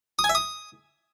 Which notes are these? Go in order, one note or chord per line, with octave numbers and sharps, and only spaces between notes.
D#6
G#5
E5
D#6